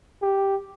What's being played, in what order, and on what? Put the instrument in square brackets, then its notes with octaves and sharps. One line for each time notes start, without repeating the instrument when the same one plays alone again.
[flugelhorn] G4